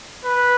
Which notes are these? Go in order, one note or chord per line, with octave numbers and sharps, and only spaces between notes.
B4